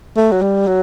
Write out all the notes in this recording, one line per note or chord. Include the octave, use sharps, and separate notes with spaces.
A3
F#3
G3
F#3